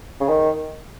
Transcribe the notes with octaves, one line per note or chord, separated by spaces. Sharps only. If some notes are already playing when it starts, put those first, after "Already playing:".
C#3
D#3